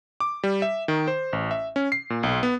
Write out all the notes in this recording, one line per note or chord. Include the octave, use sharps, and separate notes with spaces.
D6
G3
E5
D#3
C5
A1
E5
C#4
C7
A#2
B1
B3